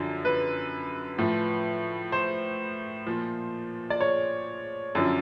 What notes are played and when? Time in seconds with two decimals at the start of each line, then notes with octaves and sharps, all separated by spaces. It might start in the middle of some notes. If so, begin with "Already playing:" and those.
Already playing: F#2 D3 F3
0.25 B4
1.18 A2 F3
2.12 C5
3.07 A#2 F3
3.90 D5
4.01 C#5
4.95 F#2 D3 F3